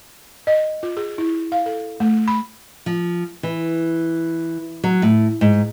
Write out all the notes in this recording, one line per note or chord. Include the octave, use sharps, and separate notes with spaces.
D#5
F4
G#4
E4
F5
A4
A3
B5
F3
E3
F#3
A2
G#2